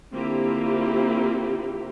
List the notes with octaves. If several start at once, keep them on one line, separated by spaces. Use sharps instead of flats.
D3 A#3 C4 E4 F4 G4